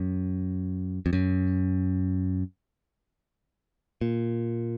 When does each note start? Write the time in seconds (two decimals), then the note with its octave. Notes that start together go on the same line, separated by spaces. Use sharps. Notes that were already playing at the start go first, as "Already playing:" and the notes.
Already playing: F#2
1.06 F2
1.13 F#2
4.01 A#2